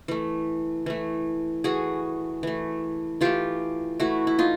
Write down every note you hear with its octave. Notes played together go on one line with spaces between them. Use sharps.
E3 A3
E3 A3
E3 A3 F#4 G#4
E3 A3
E3 A3 F4 G4
E3 A3 E4 F#4
E4
D#4 F4